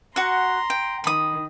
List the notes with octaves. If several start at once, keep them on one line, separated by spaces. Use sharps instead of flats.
F#4 F#5 A#5 C6
G5
D#3 B5 D#6